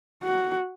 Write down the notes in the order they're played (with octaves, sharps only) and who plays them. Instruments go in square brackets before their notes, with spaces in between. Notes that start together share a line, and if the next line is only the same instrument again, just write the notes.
[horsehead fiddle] F#4